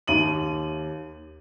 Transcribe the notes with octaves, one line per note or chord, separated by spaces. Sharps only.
D#2 D#7 F#7